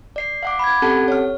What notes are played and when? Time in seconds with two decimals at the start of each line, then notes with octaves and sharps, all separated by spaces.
0.16 D5 C7
0.43 F5 F#5 D6
0.59 B5 G#6
0.82 C4 C#4 G4 A4 F#5 A5
1.08 C#5 F6